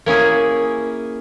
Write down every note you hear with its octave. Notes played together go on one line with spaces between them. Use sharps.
A#3 C#4 E4 G#4